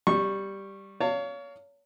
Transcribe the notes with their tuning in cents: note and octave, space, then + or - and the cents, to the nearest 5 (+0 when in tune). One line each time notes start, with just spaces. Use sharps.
G3 +0 C#6 -15
C#5 +30 F5 +0 A5 +40